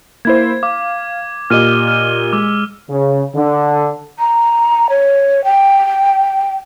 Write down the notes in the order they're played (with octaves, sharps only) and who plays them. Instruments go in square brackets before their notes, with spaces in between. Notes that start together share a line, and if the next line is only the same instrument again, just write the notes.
[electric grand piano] A#3 E4 C5 [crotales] G#6
[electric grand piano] F5 [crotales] D6
[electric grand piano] A#2 G4 D#5 [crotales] F6 D#7 G7
[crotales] F6 D#7
[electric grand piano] G#3 [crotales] D6 E6
[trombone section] C#3
D3
[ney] A#5
C#5
G5